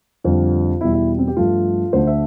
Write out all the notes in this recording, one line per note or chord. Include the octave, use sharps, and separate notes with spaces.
F2 D3 G3 F4
E2 B2 G3 E4
E4
C4
G4
G2 F3 A3 F4
D2 D3 A3 C5
E5